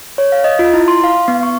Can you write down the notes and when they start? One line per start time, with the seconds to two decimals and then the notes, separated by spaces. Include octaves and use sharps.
0.18 C#5
0.32 F5
0.44 D#5
0.59 F4
0.73 E4
0.88 C6
1.04 F5
1.28 B3
1.43 C#6